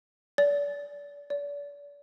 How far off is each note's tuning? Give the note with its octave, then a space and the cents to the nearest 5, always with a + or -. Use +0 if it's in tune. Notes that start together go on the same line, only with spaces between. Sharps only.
D5 -35
D5 -40